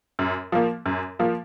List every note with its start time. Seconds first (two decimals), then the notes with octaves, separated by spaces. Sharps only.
0.19 F#2
0.52 F3 A#3
0.86 F#2
1.19 F3 A#3